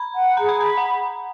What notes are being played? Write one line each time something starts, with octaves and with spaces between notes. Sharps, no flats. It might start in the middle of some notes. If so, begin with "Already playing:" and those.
Already playing: A#5 B5
F#5
G#4 A#5
B5
A#5 B5
F#5